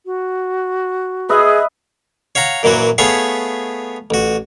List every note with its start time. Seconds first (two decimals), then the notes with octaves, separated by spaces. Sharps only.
0.06 F#4
1.29 G#4 B4 D#5 E5
2.35 C#5 F5 F#5 A#5
2.63 F#2 A#2 E3 F#3 F#4
2.98 A3 B3 G#4 C#5 F5
4.10 A1 F#4